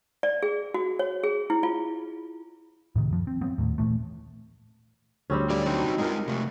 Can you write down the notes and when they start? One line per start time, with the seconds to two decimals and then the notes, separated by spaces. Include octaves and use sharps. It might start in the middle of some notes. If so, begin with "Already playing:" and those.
0.23 D5
0.43 G#4
0.74 F#4
0.99 C#5
1.24 G#4
1.50 E4
1.63 F4
2.96 A2 C3 D#3
3.11 F#2 F3
3.27 C4
3.41 F#3 B3 C4
3.58 D#1 A#1 D#2 A2
3.78 A#2 E3 A3
5.30 D2 G3 C4 C#4 G#4
5.50 G3 A#4 D5
5.66 F#3 C4 D#4 F#4
5.98 G#3 D#4 F4 A#4 D5
6.28 C3 A3